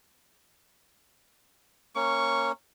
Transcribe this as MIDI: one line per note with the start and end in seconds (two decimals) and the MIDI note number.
1.96 2.52 58
1.96 2.52 61
1.96 2.51 85